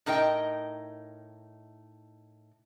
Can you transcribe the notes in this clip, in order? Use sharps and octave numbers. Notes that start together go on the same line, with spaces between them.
A2 D#4 A#4 D#5 G5